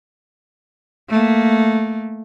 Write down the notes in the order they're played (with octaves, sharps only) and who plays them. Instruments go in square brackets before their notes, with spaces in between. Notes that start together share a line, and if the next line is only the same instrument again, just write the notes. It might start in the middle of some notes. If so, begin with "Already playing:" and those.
[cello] A3 A#3